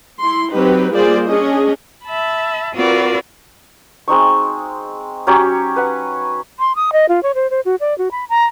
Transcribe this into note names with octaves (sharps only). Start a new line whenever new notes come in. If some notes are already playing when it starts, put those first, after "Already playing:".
E4 C6
F#3 C4 D#4 G4 B4
G3 A#3 F4 G#4 C5 D5
C#4 D4 G#4 D#5
E5 A5 B5
C4 F4 F#4 A#4 B4 D5
G#3 C4 D#4 C#6
F#3 C#4 G4 C#5
B4 F#5
C6
D#6
D#5
F4
C#5
C5
C5
F#4
D5
F#4
B5
A#5